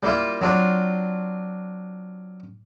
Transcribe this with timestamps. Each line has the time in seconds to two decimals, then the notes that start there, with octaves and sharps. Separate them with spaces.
0.03 G3 A#3 E4 F4
0.41 F#3 C4 D4 F4